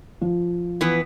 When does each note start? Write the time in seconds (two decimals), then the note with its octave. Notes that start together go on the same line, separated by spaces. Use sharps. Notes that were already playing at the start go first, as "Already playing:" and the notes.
0.21 F3
0.81 E3 B3 B4